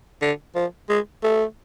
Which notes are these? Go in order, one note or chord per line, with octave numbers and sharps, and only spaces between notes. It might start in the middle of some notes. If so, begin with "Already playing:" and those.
D3
F3
G#3
A3